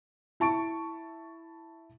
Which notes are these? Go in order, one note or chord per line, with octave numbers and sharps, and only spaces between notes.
E4 A5 C#6 D7